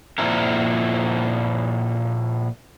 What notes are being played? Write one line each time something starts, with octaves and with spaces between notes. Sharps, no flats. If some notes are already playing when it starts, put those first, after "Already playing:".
A#2 F3 C4 E4 A#4